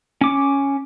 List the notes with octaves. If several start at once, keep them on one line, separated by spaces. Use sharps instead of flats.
C#4 D6